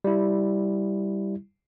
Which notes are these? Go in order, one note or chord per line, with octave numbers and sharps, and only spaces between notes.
G3 E4